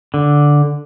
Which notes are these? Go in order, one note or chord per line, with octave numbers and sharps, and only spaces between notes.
D3